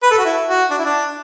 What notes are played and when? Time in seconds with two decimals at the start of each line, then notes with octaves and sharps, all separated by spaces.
0.03 B4
0.11 A4
0.18 F#4
0.25 E4
0.48 F#4
0.71 D4
0.78 E4
0.85 D4